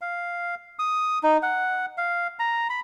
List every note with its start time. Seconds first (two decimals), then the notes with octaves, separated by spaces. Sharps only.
0.01 F5
0.79 D#6
1.23 D#4
1.43 F#5
1.98 F5
2.39 A#5
2.70 B5